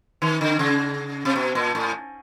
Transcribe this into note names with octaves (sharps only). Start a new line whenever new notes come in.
D#3
D3
C#3
C3
B2
A#2
A2